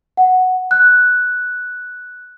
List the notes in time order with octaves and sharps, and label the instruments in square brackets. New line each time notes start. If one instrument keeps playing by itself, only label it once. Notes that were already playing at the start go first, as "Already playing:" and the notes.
[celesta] F#5
F#6